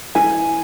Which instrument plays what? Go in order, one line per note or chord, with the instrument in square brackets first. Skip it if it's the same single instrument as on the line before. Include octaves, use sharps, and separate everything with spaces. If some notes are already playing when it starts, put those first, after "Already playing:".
[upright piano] E3 G#5